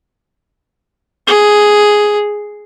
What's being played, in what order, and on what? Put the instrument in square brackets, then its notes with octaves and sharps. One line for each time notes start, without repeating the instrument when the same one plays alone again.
[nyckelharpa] G#4